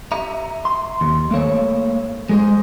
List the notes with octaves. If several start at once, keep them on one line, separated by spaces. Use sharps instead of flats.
E5 A#5
C6
D#2
A3 A#3 C5 C#5
G#3 G#4 C5